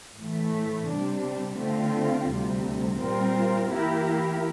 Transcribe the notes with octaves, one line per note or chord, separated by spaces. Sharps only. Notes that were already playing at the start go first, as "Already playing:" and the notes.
A2 E3 A3
C3 G3 D4
D3 A3 C4 F4
D2 C3 G3
A#2 G3 C4 F4 A#4
E3 A#3 E4 G4 A#4